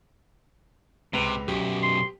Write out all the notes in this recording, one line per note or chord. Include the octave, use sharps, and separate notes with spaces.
C#2 C3 B4 F7
B1 F#2 G4
C6